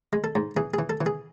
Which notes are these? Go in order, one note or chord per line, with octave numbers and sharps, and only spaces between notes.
G#3
A4
G#2
E3 G#4
E3 G#4
A4
E3
G#4